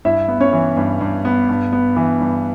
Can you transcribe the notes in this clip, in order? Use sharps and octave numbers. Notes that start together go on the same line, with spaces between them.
G2 E4 E5
B3
C#4 C#5
E3
G2
G2
B3
G2
B3
E3
G2